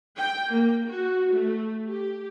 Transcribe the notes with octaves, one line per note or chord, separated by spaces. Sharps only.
G5
A#3
F#4
A3
G4